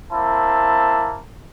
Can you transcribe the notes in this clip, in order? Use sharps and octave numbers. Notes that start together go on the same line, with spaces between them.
A#3 C4 E4 A5